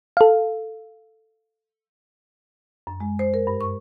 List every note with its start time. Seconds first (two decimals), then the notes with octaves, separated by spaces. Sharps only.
0.17 A4 F5
2.87 F#2
3.00 G#3
3.19 C5
3.34 A#4
3.47 G2
3.61 C#6